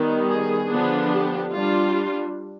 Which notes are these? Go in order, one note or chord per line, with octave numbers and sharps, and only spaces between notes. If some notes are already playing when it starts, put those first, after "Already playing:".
Already playing: D#3 G3 B3
G#4
D3 F3 B3 D4
G4
G3 D4 F4